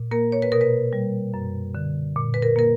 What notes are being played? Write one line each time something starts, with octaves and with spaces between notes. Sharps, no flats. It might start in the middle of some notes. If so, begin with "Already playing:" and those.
Already playing: A#2
A#3 A#4
C#5
B4
B2 A#4
B4
G3
F#2
D3
A#2
B4
A#4
A#3 A#4